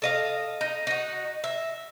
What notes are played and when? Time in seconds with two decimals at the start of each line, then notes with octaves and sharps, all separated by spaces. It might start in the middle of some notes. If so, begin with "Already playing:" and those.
0.02 A4 D#5 F5
0.61 D#4
0.87 D#4 F#4
1.44 E5